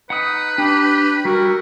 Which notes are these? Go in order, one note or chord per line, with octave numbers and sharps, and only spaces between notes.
D#4 B4 F#5 B5 D#6
D4 G4
G3 E4 F#4 A#4